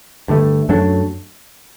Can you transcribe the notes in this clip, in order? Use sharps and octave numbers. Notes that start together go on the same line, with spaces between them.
G2 D3 A3
F#2 F#3 A3 D4